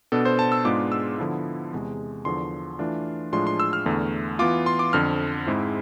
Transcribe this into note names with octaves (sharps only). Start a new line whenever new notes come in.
B2 B3 D4 A4
C5
A5
E6
G#2 G#3 B3 D4 F4 D6
E6
D3 F3 B3 E4
E2 C3 G#3
E2 D3 F3 C6
E3 A3 D4 F4
A2 F3 G#3 D4 F4 C6
C6
E6
F6
E2 D3 A3
E3 B3 F4 D6
C6
D6
F2 D3 F3 F6
G#2 G#3 C4 E4